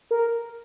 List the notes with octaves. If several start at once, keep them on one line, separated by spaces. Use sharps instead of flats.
A#4